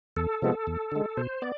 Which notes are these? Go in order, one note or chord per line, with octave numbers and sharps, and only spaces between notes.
E2 A4
C3 F3 G#3 B3
E2
D3 G#3
B2 C5
B3 D5